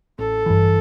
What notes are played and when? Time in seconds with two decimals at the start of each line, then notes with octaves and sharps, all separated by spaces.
0.19 A1 A4
0.46 G2 E3